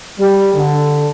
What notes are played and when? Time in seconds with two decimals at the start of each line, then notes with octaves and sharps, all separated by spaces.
0.19 G3
0.55 D3